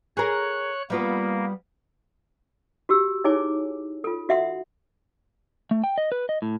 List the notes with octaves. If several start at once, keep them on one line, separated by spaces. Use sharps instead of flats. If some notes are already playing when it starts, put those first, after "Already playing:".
G#4 A#4 C#5 F#6
G3 A#3 B3 F4
F#4 G4 E6
D#4 E4 G#4 C#5 G#5 D6
F4 A4
F#4 E5 F#5 C6
A3
G5
D#5
B4
D#5
A2